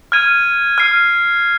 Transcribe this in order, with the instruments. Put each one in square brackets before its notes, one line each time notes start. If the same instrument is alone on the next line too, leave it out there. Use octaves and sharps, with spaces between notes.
[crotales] F6 G#6 D#7
F6 C7 D#7